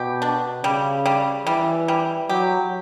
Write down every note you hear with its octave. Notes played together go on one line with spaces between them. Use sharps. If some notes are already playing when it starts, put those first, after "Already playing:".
Already playing: B2 G4
D4
C#3 G3
G3
E3 G3
G3
F#3 G4